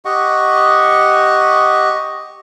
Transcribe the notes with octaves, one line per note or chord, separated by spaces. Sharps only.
G4 D#5 F#5 C#6